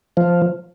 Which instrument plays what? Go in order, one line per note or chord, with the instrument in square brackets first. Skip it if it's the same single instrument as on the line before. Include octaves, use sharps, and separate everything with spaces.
[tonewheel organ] F3